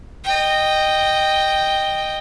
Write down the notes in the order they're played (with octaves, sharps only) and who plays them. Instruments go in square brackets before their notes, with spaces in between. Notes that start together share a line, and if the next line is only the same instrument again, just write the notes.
[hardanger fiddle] D#5 G5